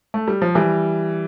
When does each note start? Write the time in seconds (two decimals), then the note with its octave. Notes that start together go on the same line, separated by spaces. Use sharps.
0.14 A3
0.28 G3
0.42 F3
0.55 E3 G3